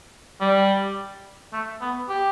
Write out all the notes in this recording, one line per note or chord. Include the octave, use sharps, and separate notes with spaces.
G3
A3
B3
G4